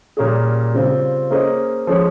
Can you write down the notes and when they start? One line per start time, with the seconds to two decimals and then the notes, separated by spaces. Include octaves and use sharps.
0.17 A#2 G3 A#3 C#4 G#4
0.74 C#3 G3 C4 F4
1.30 A#3 C#4 G#4 C5 D#5
1.87 F3 G#3 C#4 G#4 C#5